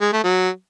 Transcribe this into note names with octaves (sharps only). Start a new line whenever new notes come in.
G#3
A3
F#3